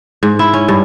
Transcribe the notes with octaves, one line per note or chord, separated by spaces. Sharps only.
G#2
E4
C#4
G2